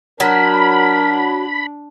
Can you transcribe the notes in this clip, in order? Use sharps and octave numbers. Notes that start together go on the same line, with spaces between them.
F#3 D4 A#4 B5